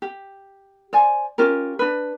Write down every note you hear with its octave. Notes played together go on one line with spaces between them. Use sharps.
G4
C5 D5 G#5
C#4 F4 G4 A#4
D4 B4